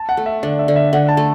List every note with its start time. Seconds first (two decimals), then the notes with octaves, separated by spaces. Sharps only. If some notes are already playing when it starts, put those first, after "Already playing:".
Already playing: A5
0.09 F#5
0.17 A3
0.26 E5
0.43 D3 D5
0.59 E5
0.68 D3
0.76 E5
0.93 D3 F#5
1.09 A5
1.17 A3